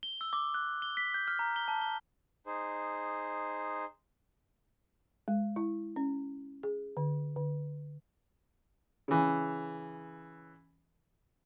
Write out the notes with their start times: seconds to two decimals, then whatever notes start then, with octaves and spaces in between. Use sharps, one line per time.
0.03 G7
0.21 E6
0.33 D6
0.54 F#6
0.82 G7
0.97 B6
1.14 G6
1.28 F6
1.39 A#5
1.56 G7
1.68 A5
1.81 G7
2.46 D#4 G#4 C5
5.28 G#3
5.56 E4
5.96 C#4
6.63 G#4
6.97 D3
7.36 D3
9.08 C#3 E3